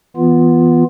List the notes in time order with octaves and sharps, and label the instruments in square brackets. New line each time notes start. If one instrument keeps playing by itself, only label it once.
[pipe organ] E3 B3 F4